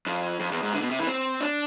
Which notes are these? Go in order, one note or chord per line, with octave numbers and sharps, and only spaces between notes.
F2
F2
E2
G#2
D3
B2
C3
E3
C4
D4